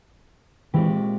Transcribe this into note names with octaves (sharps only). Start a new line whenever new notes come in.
A#2 E3 G#3 C4 G4